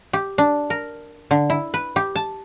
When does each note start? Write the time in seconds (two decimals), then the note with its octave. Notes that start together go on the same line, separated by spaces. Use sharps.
0.13 G4
0.38 D4
0.70 A#4
1.31 D3
1.50 E4
1.74 B4
1.96 G4
2.16 A5